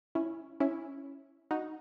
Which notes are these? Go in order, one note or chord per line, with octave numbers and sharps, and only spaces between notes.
C#4 E4
C#4 E4
D#4 F#4